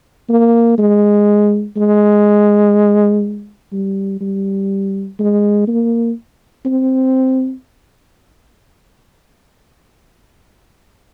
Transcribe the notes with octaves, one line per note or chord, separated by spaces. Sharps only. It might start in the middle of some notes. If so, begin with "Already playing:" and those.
A#3
G#3
G#3
G3
G3
G#3
A#3
C4